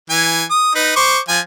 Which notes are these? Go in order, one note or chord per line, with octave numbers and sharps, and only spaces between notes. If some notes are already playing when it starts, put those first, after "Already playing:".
E3 G#5
D#6
D#4 B4
C5 C#6 D6
F3 G#5